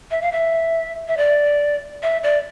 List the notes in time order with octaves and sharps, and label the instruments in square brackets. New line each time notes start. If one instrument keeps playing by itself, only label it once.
[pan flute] E5
F5
E5
E5
D5
E5
D5